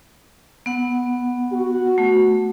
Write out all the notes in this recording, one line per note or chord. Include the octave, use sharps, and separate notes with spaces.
B3 F#5
F#4
A3